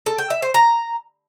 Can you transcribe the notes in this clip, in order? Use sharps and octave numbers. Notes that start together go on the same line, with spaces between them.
A4
G5
E5
C5
A#5